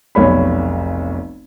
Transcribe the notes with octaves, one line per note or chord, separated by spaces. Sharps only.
F1 B1 C#5 B5